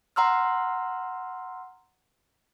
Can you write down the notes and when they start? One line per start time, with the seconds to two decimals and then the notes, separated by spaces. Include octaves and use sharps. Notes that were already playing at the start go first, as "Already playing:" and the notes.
0.16 F#5 A#5 C6 E6 F6